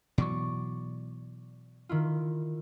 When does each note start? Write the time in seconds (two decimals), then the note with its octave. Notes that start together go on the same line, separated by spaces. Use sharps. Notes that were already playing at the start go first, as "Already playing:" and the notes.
0.18 B2 E3 F#3 D5 C#6
1.89 D#3 E4 F4